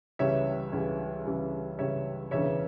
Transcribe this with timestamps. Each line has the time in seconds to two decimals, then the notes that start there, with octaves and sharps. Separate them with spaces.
0.19 C#2 C#3 E3 G3 C#5 E5
0.73 C#2 C#3 E3 G3
1.25 C#2 C#3 E3 G3
1.78 C#2 C#3 E3 G3 C#5 E5
2.31 E1 D2 C#3 E3 B3 C#5 E5